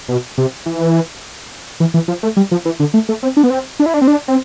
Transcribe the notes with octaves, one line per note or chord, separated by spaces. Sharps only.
B2
C3
E3
E3
E3
F3
A3
G3
F3
E3
D3
A3
A3
C4
D4
B3
C4
D4
E4
D4
C4
D4
C4